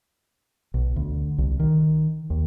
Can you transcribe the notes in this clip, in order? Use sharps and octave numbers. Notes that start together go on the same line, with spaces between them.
B1
D2
C2
D#3
D#2